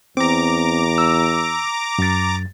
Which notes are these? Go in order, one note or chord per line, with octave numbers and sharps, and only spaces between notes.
E2 C4 A#5 D6
E6
F#2 A6